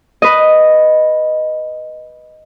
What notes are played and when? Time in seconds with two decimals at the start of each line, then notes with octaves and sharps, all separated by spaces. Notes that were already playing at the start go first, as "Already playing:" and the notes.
0.22 B4 D#5